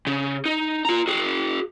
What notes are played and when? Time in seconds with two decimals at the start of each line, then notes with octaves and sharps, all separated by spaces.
0.07 C#3
0.45 D#4
0.85 F4 A#5
1.08 F#4 G#4